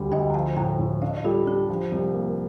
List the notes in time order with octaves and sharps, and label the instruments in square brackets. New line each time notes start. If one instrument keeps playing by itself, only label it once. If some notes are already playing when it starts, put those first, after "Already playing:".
Already playing: [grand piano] D2 G3
[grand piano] D2 [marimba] D#5 G5
[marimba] A#5
[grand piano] F3 [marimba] F5 A5
[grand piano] A2 [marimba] G5 A#5
[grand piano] A2
[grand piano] D4 [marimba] F5
[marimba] D#5
D5 F5
[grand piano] G3 [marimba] F4 A4
[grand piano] D4 [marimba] G4
[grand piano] F3
C2
A#3